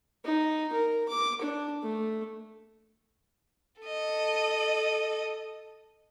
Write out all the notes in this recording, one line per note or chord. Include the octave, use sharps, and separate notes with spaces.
D#4
A#4
D6
D4
A3
A4 D#5